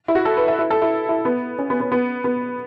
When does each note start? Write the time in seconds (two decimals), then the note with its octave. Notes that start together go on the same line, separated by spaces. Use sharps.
0.08 E4
0.15 F#4
0.25 A4
0.37 B4
0.48 E5
0.59 E4
0.70 A4
0.82 E4
1.09 E4
1.25 B3
1.58 C#4
1.70 B3
1.80 B3
1.92 B3
2.24 B3